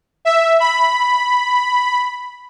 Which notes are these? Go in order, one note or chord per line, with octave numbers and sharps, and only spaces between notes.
E5
B5